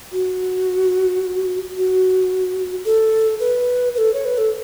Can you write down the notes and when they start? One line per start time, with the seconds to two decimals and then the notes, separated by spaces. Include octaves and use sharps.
0.12 F#4
1.77 F#4
2.85 A4
3.40 B4
3.95 B4
3.98 A4
4.14 C#5
4.25 B4
4.38 A4